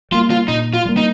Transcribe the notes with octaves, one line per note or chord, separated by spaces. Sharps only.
G3 A#3 F4
F4
A#2 D#4
F4
G3 A#3
D#4